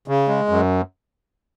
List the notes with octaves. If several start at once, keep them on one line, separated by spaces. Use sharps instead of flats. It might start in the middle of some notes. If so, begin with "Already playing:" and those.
C#3
G#3
F#2